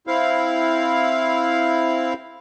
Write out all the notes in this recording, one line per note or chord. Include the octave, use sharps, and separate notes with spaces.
C4 E4 F5